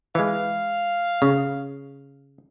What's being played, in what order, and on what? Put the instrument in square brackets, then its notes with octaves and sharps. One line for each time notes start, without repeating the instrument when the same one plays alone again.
[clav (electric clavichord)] E3 G#3 [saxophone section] F5
[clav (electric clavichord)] C#3